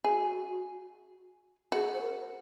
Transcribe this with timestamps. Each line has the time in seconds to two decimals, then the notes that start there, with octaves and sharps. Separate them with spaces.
0.04 F#4 G#4
1.72 F#4 G#4
1.94 C5
2.01 A#4